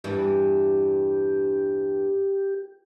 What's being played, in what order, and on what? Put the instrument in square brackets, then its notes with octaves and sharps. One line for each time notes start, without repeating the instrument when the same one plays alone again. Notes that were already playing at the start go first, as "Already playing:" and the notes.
[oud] E2 G2 E3 [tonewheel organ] G4